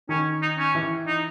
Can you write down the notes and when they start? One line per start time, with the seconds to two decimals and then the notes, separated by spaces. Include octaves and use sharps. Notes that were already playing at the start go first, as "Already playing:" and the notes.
0.09 D#3 C#4
0.42 D#4
0.58 C#4
0.75 E3
1.07 D#4